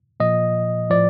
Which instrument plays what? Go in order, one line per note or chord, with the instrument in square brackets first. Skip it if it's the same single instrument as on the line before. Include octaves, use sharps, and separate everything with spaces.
[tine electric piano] A#2 F3 D#5
A2 F3 D5